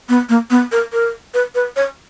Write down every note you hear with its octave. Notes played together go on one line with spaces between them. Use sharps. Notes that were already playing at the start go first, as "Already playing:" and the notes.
B3
A#3
B3
A#4
A#4
B4
B4
C#5